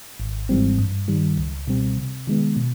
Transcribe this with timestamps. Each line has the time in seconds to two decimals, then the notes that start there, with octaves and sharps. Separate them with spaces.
0.20 G#1
0.49 G#2 E3 G3 C4
0.79 G2
1.08 D#3 G3
1.38 C#2
1.67 B2 G3 C4
1.97 C3
2.27 D#3 G#3 B3
2.56 B2